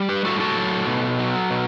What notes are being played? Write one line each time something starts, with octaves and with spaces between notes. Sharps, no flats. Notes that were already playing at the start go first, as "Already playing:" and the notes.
Already playing: G3
G4 B4
A2 F#4 A4
F#4 A4
F#3
B2
F#3
B2